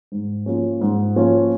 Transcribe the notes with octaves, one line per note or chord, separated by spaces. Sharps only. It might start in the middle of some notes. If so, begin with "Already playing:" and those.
G#2
F3 A#3 C#4
G#2
F3 A#3 C#4